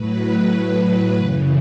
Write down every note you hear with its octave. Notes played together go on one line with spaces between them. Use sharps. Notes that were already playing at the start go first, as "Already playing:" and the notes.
Already playing: A2 F#3 B4
A2 F#3
F#2 C#3 E3